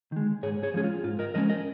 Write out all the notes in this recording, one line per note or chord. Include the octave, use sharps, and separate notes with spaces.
D#3 G#3
G#2 G#4 C#5
G#4 C#5
F3 G#3 C#4 G#4
F4
G#2 F4
A#4 D#5
F3 G#3 C#4 A#4 D#5
A#4 D#5